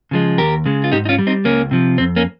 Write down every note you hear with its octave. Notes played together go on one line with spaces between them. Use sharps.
C#3 F3 G#3
D#2 G4 A#4
C#3 G#3
F4
G#2 D#4 G4
D#4
C#4 F4
G3
C4 D#4
C#2 A#3 C#4
C3 F3
F2 C4
A#3 C#4